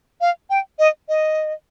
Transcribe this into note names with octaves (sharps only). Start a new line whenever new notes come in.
F5
G5
D#5
D#5